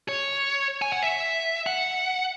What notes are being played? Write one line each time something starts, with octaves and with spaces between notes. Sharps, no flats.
C#5
G#5
F#5
E5
F#5